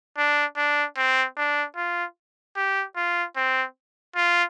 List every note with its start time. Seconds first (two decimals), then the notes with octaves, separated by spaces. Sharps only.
0.17 D4
0.57 D4
0.97 C4
1.37 D4
1.76 F4
2.56 G4
2.96 F4
3.36 C4
4.16 F4